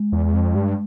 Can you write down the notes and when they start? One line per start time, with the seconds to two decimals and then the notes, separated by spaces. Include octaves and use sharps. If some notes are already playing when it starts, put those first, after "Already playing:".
Already playing: G#3
0.12 E2
0.34 F2
0.55 G2